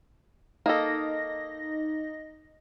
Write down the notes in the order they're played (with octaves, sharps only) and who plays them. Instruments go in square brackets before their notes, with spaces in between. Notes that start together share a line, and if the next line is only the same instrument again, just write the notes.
[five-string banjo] A#3 A4 [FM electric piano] D#4 D#5 A#6